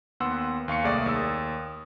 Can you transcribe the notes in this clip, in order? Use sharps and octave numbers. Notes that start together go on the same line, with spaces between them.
D#2 B3 F#5 C6 E6
D#2 F5 C#6 C#7
C2 A3 A#3 G#4 D5
D#2 D#6 E6